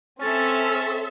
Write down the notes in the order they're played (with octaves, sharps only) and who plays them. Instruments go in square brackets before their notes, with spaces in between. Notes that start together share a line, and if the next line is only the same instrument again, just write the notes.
[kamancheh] C4 [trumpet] C#4 [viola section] A4 E5 [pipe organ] A6